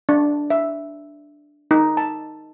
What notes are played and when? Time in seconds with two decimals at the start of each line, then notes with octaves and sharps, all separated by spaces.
0.09 D4
0.50 E5
1.71 D#4
1.97 A5